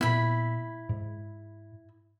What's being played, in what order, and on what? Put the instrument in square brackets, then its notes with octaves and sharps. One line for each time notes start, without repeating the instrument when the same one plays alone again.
[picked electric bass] A#2 B3 [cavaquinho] E4 B5
[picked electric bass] G#2